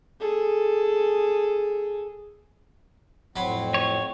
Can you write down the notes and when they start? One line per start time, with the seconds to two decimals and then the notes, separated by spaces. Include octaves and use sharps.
0.20 G#4 A4
3.36 F2 A2 F#3 C4 B5 C6
3.74 C#5